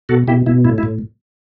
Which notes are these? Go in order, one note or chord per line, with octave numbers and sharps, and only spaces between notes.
B2 F#4 A4
B2 E4 G4
B2 E4
A2 E4
E4
A2